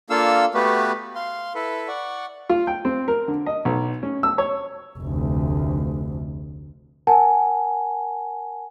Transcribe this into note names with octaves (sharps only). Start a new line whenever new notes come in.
A#3 D4 F4 A4 F5 E6
A3 B3 F#4 G4 B4
F5 C6
E4 A4 B4
D5 F#5 C#6
F4
G5
C4
A#4
D3
D#5
B1
C#4
E6
C#5
F1 D2
A#4 F#5 G#5 A5